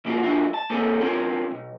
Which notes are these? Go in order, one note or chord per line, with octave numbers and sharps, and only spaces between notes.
C3 A#3 C#4 D#4 F4 F#4
F#3 D4 E4 F4
A5
A#3 C4 C#4 A4
C4 C#4 F4 A#4
B1